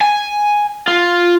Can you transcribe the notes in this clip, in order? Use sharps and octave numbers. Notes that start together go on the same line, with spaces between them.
G#5
F4